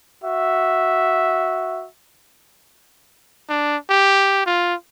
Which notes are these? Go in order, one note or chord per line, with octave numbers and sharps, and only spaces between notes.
F#4 E5
D4
G4
F4